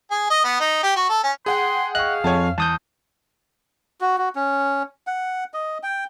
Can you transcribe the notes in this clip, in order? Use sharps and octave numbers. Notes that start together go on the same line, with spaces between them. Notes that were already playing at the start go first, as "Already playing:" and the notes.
G#4
D#5
B3
D#4
G4
F#4
A4
C#4
G#4 F#5 G5 C6
D#5 F5 C#6 F#6
F2 C#5 G#5 A5
E2 A5 D#6 G6
F#4
F#4
C#4
F#5
D#5
G5